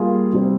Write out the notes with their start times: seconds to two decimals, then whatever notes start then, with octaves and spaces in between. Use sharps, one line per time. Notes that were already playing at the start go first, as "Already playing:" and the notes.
Already playing: G3 A#3 F4 G#4
0.33 C3 G3 C4